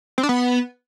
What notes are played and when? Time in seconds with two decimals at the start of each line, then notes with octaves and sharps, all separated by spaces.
0.18 C4
0.23 D4
0.29 B3